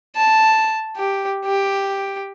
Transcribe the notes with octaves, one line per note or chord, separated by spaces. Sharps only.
A5
G4
G4